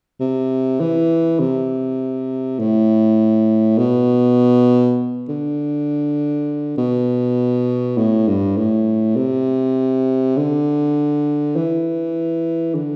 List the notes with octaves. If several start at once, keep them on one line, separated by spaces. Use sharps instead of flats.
C3
E3
C3
A2
B2
D3
B2
A2
G2
A2
C3
D3
E3
D3